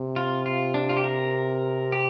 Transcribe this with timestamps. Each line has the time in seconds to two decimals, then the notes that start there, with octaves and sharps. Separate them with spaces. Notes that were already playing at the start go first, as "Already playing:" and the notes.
Already playing: C3
0.16 F4
0.46 F4
0.74 D4
0.89 F4
0.97 G4
1.04 A#4
1.92 G4